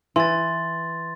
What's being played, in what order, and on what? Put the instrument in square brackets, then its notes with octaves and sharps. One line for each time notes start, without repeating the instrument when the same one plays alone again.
[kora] E3 [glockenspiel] C6 A6